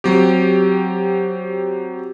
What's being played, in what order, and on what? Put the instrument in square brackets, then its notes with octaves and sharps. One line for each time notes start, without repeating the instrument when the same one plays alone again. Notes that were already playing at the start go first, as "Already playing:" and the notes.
[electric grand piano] F#3 C4 G4